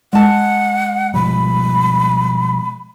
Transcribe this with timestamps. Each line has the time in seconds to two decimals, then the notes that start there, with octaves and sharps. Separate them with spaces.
0.13 G#3 F#5 A5
1.14 B2 F3 G3 B5